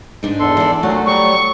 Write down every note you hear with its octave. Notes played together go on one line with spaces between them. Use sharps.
G#2 D4 D#4
E2 A4 C6
E3 D5
A#2 F#3 A3 F#4
F#3 G3 C#6